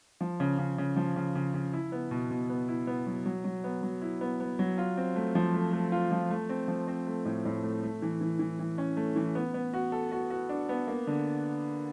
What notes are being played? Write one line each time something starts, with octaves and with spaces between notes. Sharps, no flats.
F3
C#3
C#3
C#3
F3
C#3
C#3
C#3
E4
B3
B2
B2
B3
E4
B3
F#3
F#3
F#3
B3
F#3
E4
B3
B3
F#3
F4
C4
A3
F3
A3
A3
F4
F3
A3
C4
F3
C4
A3
A2
A2
A3
A3
E3
E3
E3
E3
C#4
A3
E3
B3
B3
F#4
A4
F#4
F#4
D4
B3
A#3
D3